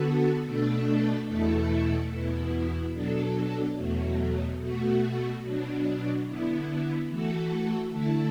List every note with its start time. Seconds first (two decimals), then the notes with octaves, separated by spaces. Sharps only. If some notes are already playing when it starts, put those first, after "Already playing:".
Already playing: D3 B3 F#4 A4
0.45 B2 A3 D4 A4
1.27 E2 B2 A3 E4 A4
2.11 E2 B2 B3 E4
2.94 B2 F#3 D4 A4
3.76 E2 B2 F#3 A3
4.60 B2 A3 F#4
5.43 B2 F#3 D4
6.26 D3 B3 E4
7.08 E3 A3 F#4 A4
7.91 D3 A3 E4 A4